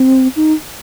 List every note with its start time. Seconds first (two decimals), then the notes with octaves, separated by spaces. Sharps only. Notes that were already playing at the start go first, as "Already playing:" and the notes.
Already playing: C4
0.36 D#4